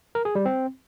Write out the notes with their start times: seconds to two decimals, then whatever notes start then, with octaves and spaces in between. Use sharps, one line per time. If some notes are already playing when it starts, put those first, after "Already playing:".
0.15 A#4
0.25 G#4
0.35 G3
0.46 C4